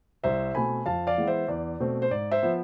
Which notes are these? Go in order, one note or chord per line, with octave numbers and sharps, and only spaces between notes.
C2 C5 E5
B2 A3 C4 G#5 B5
F2 F5 A5
D5 F5
E3 G#3 B3
C5 E5
E2 D5
B2 A3 C4
C5
G#2 D5
C5 E5
F3 B3